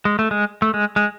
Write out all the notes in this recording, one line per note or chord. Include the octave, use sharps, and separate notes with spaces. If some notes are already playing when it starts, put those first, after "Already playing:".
G#3
A3
G#3
A3
G#3
G#3